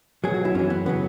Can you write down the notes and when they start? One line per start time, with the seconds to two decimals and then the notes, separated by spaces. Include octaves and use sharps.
0.24 B1 B2 F#3 G#4
0.34 F#4
0.45 E4
0.54 F#2 E3 C#4
0.70 B3
0.86 C#3 F#3 B3